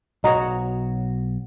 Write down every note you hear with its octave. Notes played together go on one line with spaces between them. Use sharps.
B1 F#4 C#5 D#5 A#5